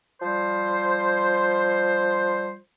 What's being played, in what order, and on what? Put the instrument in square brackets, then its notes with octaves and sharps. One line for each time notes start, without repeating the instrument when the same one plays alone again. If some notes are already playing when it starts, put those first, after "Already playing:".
[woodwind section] F3 G3 C5